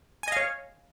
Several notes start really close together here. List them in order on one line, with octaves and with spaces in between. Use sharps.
G#5 D#5 F5 C#5